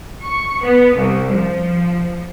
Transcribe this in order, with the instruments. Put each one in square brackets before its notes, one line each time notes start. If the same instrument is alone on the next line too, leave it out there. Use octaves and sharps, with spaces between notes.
[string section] C#6
B3
C2
F3